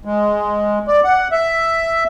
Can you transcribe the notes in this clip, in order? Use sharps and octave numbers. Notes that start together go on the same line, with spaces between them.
G#3
D5
F#5
E5